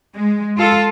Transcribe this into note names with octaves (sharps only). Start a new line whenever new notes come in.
G#3
F4 A4